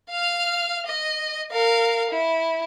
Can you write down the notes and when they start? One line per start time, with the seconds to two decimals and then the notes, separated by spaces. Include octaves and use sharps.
0.11 F5 F6
0.87 D#5
1.52 A#4 F5
2.11 E4